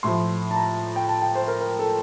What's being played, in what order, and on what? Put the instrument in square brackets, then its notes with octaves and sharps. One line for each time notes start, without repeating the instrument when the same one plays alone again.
[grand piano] A2 F3 C6
A5
A#5
G5
A5
G5
C5
A#4
A#4
A4